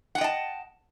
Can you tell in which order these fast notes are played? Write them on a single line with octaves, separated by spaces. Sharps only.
F#5 G5 D#5 A5